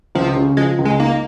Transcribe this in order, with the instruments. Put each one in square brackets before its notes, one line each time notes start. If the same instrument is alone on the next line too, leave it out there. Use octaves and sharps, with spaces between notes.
[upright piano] C#2 [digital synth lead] F3
[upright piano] C#3
[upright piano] F3 [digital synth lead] G#3
[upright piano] C#2
[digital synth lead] G#3
[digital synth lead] A#3 [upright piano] D#4